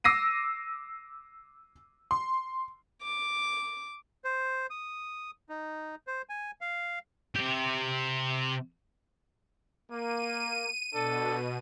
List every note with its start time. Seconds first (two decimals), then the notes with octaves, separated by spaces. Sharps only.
0.04 D6 E6 A#6 C7 D#7
2.11 C6
3.03 D6
4.24 C5
4.70 D#6
5.49 D#4
6.07 C5
6.29 G#5
6.61 F5
7.35 C3 G4
9.90 A#3 D#7
10.93 B2 D4 A4